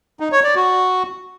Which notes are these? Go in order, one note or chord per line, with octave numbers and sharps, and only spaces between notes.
D#4
C#5
D5
F#4